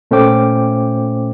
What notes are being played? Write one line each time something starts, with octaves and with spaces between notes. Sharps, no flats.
A#2 A3 C#4 C5 G5 D6